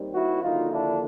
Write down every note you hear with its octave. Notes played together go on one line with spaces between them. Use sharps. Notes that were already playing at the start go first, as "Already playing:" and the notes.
Already playing: D#2 D#3 G3 C4
E4 F#4
D#2 D3 F3 A#3 D#4 F4
D4 E4